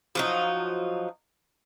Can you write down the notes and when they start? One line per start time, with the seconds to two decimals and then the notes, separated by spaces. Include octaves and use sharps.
0.15 F3 F#3 D#4